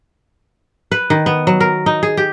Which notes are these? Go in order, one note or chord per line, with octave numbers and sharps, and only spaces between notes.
B4
D#3
B3
F#3
A#4
D#4
G#4
G4